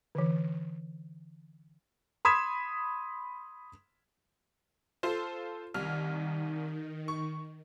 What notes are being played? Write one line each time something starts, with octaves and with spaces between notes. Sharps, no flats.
D3 E3
B5 C6 D#6 G#6 B6 E7
F4 A4 C5
C2 D#3 F6
C#6